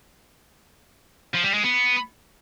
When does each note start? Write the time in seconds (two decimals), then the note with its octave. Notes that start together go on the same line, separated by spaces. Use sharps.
1.34 F3
1.44 G3
1.54 G#3
1.64 B3